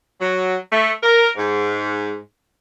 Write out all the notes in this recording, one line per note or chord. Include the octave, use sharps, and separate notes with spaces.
F#3
A3
A#4
G#2